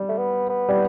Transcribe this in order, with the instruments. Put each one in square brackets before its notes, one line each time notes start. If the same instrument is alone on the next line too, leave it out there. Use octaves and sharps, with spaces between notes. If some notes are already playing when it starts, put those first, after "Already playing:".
Already playing: [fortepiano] G3
[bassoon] A3
B3
B3
[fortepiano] G3